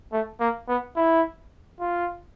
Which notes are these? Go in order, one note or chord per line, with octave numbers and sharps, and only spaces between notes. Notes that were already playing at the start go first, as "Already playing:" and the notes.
A3
A#3
B3
E4
F4